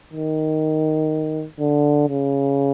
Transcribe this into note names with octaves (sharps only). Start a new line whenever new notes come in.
D#3
D3
C#3